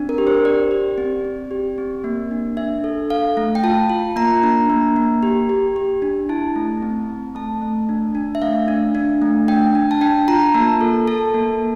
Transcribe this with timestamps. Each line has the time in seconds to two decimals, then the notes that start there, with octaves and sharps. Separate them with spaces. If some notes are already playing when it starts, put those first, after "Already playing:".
Already playing: C4 D4
0.09 A#4
0.18 G4
0.27 C5
0.44 G4 D5
0.71 G4
0.98 C4
1.25 C4
1.51 G4
1.78 C4
2.04 A#3
2.31 D4
2.57 D4 E5
2.84 A4
3.10 A4 F5
3.37 A3
3.55 G5
3.64 F4 A5
3.90 F4
4.16 A#3 A#5
4.43 D4
4.70 A#3
4.96 A#3
5.23 G4
5.49 G4
5.76 G4
6.02 D4
6.29 E4 A5
6.56 A3
6.82 C4
7.09 C4
7.35 A3 A5
7.62 A3
7.89 D4
8.15 D4
8.35 E5
8.42 A3 F5
8.68 D4
8.95 D4
9.22 A3
9.48 D4 G5
9.75 D4
9.91 A5
10.01 D4 G5
10.28 F4 A#5
10.54 A#3 A5
10.81 A4
11.07 A4 A5
11.34 A#3